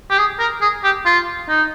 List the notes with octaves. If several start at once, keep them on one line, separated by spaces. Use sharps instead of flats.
G4
G#4
A#4
G#4
G4
F4
D#4